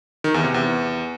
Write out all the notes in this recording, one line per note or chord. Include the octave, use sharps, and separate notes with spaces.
D#3
E2
C3
E2